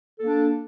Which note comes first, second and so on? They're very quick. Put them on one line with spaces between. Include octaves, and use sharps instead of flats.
A4 A#3 D4